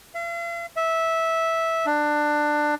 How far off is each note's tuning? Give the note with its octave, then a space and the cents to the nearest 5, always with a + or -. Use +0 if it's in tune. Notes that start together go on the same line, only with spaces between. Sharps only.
F5 -45
E5 -10
D4 +20